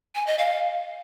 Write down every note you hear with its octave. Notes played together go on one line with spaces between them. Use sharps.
G#5
D#5
F5